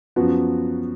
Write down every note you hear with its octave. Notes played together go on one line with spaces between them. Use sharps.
F#2 F3 B3 F#4